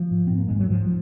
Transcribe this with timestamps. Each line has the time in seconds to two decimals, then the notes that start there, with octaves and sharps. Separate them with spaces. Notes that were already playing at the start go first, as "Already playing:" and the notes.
Already playing: F3
0.11 G#2
0.27 G#2 C4
0.38 A#3
0.48 G#2 G#3
0.59 F#3
0.70 G#2 F3